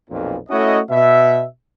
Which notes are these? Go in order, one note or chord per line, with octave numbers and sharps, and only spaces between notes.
B1 F2 A#2
A3 C#4 E4 F#4 C#5 D#5
B2 E5